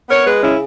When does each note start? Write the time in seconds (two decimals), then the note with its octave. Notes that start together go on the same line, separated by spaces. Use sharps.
0.09 B3 A#4 C#5
0.26 G#3 G#4 B4
0.43 C#3 C#4 E4